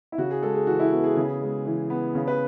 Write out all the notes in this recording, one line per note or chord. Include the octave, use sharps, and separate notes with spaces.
E4
C#3 F#4
G#4
G#3 A4
G#4
E3 F#4
E4
B3 F#4
G#4
C#3
G#3
E3
B3
C#3
B4